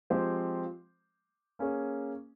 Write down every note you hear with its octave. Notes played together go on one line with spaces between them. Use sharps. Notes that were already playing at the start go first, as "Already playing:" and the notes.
F3 G#3 C4 G4 C5
A#3 C#4 G#4 C#5